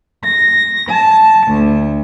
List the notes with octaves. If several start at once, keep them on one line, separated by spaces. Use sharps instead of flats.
A#6
A5
D2